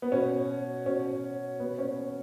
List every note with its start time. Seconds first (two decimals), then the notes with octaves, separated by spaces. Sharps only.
0.02 B3
0.12 B2 C#4
0.86 B2 C#4
1.60 B2 B3
1.79 C#4